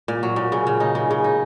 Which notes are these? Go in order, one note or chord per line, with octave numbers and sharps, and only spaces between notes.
A#2
F#3
A#2
C#3
C#3
D#4
C#3
C#3
D#4